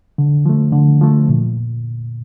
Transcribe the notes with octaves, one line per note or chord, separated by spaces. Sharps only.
D3
F3 A3
D3
F3 A3
A#2